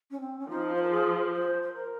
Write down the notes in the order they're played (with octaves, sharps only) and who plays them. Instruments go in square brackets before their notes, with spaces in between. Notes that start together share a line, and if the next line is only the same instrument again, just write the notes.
[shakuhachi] C#4
C4
C#4
[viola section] F3 [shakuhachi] D#4
[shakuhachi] C5
A#4
G#4
C5
C5
A#4